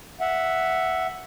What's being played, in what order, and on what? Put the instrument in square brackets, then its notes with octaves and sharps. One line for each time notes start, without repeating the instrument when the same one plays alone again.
[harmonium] E5 F#5